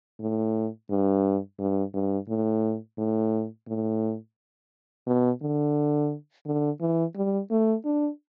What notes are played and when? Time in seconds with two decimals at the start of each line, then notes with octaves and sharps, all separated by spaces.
0.20 A2
0.90 G2
1.59 G2
1.94 G2
2.28 A2
2.98 A2
3.68 A2
5.06 B2
5.42 D3
6.46 D3
6.80 E3
7.15 G3
7.51 A3
7.85 D4